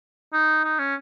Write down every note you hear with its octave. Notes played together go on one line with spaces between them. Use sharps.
D#4
D#4
C#4